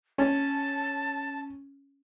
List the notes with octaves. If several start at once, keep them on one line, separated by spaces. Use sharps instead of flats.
C#4 A5